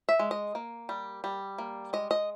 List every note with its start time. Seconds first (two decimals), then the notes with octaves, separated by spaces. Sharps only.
0.09 E5
0.19 G#3
0.31 D#5
0.55 A#3
0.89 G3
1.24 G3
1.58 A#3
1.93 G#3 D#5
2.11 D#5